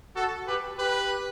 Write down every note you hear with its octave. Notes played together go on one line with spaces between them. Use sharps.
F#4 A4
G4 B4
G4 B4